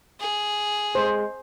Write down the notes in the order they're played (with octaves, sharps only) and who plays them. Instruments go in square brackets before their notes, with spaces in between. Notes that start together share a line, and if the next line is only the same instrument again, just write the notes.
[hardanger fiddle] G#4
[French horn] G#3 [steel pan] C5